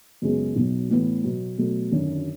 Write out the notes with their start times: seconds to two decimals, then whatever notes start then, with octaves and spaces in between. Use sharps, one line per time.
0.22 F#2 C#3 G#3 B3
0.56 B1 B2 F#3
0.90 A2 E3 B3
1.23 B2 F#3 B3
1.58 B2 F#3 A3
1.92 G#1 F#2 D3 F#3